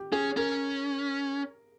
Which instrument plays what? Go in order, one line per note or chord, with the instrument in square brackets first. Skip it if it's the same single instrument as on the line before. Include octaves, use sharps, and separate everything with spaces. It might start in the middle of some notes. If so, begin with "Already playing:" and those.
Already playing: [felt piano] G4
[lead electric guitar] C#4 [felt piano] G#4
[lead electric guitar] C#4 [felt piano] A#4